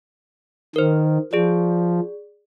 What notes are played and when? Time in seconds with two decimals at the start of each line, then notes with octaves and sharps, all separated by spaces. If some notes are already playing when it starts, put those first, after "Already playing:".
0.76 D#3 A#4 C5
1.33 F3 G#4 D5